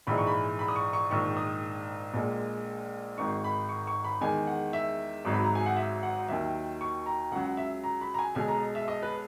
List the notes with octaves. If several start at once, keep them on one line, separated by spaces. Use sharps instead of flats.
A#1 G#2 E3 G#3 B5
C#6
B5
B5
D#6
C#6
C#6
A#1 G#2 D#3 C#6
D#6
A#1 A#2 G#3
G#1 G#2 D#3 C#6
B5
C#6
C#6
B5
E2 D#3 G#3 G#5
F#5
E5
G#1 G#2 F#3
B5
A#5
G#5
F#5
E5
F#5
D#2 D#3 F#3 E5
C#6
A#5
C#2 C#3 F#3 F#5
F#5
E5
A#5
B5
A#5
G#5
B1 B2 G#3 G#5
A#5
E5
D#5
B4